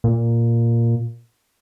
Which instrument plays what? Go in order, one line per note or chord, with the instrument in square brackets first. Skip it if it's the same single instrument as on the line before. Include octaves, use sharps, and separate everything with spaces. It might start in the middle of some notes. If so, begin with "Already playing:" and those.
[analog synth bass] A#2